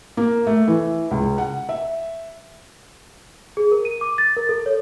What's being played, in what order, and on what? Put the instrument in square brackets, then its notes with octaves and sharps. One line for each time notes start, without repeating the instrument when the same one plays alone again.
[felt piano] A#3
A3
E3
C#2
F#5
E5
[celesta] G#4
A#4
D#7
D6
A6
A#4
A4
C#5